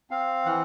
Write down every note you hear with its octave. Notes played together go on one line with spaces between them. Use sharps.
C4 F5
E3 F#5